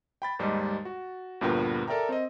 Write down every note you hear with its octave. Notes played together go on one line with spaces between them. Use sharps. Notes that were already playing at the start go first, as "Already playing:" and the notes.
G5 B5 A6
D#2 G#2 G3 G#3 D#4
F#4
D2 G2 A#2 B3 A#4 G5
A4 A#4 D5 E5 G5 A#5
C4 D#5